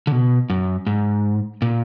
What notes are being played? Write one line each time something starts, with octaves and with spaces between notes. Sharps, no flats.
D3
B2
F#2
G#2
A#2